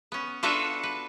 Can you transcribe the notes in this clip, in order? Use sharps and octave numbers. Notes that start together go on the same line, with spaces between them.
B3 C#4
D4 F4 F#4 A4 B4 E5
B4